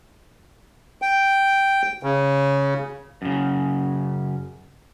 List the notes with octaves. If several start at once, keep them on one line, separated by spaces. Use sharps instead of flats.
G5
C#3
F#2 C#3